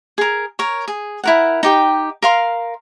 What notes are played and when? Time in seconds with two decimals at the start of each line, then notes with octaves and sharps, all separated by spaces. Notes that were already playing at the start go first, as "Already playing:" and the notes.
0.18 G#4 A#4
0.59 A#4 C#5
0.88 G#4
1.24 E4 A#4 F#5
1.63 D#4 G4 G5
2.23 A#4 F5 C6